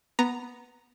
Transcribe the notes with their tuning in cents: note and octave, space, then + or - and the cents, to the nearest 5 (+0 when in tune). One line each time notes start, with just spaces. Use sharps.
B3 +0 A#5 +0